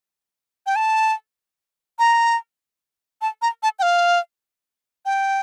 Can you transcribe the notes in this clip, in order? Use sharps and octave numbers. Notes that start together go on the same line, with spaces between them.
G5
A5
A#5
A5
A#5
A5
G5
F5
G5